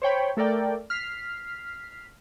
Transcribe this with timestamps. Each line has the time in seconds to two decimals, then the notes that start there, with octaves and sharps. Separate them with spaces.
0.02 C5 C#5 G5 B5
0.37 A3 A4 A#4 D5 G5
0.90 F6 B6 C7